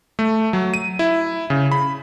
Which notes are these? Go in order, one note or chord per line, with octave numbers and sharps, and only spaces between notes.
A3
F#3
D#7
E4
C#3
B5